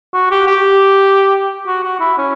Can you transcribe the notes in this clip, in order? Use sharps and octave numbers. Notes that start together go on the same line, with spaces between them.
F#4
G4
G4
F#4
F#4
E4
C#4